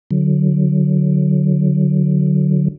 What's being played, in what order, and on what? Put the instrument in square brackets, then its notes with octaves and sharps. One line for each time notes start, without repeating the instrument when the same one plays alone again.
[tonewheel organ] D3 F#3